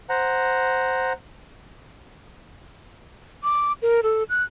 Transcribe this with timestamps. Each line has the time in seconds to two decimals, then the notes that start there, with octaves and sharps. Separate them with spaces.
0.09 C5 F#5 A#5
3.43 D6
3.82 A#4
4.03 A4
4.30 F#6